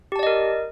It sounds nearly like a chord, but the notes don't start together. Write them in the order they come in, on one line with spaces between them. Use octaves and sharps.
G4 A5 D5 D#5 A#4